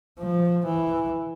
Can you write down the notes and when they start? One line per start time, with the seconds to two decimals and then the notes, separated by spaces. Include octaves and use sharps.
0.18 F3
0.65 E3